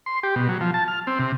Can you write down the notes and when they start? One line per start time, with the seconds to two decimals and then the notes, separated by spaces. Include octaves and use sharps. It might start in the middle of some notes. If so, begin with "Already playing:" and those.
0.06 C6
0.23 G4
0.36 B2
0.48 F#3
0.61 F3
0.74 A5
0.88 F6
1.07 C4
1.19 C3